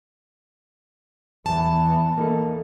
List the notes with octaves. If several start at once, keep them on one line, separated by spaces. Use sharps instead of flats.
E2 E3 B3 A5
A#3 D#4 A4